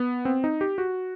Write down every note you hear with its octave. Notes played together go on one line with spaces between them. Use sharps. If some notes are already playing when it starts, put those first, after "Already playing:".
Already playing: B3
C4
D#4
G4
F#4